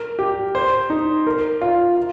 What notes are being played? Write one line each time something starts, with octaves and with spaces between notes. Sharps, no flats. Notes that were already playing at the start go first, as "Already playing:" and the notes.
Already playing: A#4
G4
C5
D#4
A#4
F4
F4